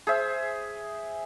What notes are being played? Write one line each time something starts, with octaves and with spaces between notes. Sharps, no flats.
G#4 C5 E5